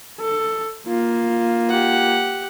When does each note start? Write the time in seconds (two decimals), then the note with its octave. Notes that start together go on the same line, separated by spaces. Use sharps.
0.20 A4
0.88 A#3 F4
1.69 G4 F#5